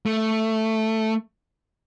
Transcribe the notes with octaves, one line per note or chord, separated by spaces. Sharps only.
A3